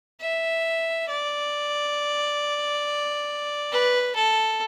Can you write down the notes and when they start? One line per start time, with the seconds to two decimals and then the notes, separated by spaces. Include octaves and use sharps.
0.21 E5
1.09 D5
3.72 B4
4.15 A4